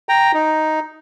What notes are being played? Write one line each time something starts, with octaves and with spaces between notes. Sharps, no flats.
G5 A#5
D#4